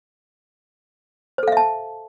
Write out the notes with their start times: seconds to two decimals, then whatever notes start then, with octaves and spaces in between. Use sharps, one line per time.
1.38 C5
1.43 A4
1.48 F5
1.52 E5
1.57 A5